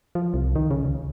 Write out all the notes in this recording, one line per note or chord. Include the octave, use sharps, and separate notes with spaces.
F3
C2
D#3
C#3
C#2